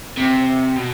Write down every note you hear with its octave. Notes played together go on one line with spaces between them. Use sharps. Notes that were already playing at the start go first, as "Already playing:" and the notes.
C3
B2